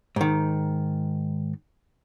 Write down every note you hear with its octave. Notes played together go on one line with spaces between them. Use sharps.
G#2 D#3